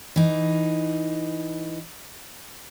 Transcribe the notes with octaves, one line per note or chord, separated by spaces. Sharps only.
E3 D#4